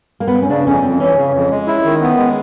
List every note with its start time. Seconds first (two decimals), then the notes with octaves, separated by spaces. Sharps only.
0.20 A#3
0.28 B3
0.35 C4
0.42 C#4
0.49 C#3 D4
0.66 F2 C#4
0.82 F2 C4
1.00 E3 C#4
1.16 C#3
1.33 F2
1.50 G#3
1.67 E4
1.85 D#3
2.01 B3
2.18 G#3